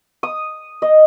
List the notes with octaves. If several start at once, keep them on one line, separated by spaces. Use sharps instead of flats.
D#6
D#5